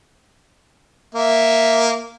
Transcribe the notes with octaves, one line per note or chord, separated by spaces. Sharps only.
A#3 E5